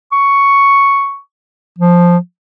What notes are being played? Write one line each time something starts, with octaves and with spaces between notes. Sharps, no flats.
C#6
F3